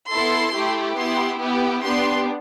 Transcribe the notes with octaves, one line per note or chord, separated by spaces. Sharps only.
B3 E4 A4 C6
A3 E4 G4
B3 E4 G4 C6
B3 E4 G4
B3 D4 G4 C6